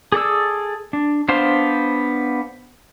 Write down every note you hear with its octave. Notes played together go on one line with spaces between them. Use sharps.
G#4 A4 D5 E6
D4
B3 D4 C5 F5 C6